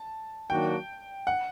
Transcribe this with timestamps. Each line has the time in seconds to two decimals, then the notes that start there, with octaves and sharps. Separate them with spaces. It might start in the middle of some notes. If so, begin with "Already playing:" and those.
Already playing: A5
0.50 D#3 F#3 A#3 D4 F#4 G5
1.27 F#5